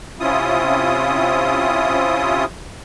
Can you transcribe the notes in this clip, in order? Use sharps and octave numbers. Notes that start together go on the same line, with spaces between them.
C3 C#4 E4 F4 D#6